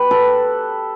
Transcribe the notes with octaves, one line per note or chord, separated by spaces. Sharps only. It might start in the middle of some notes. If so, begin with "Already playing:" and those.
Already playing: G4 B4
A4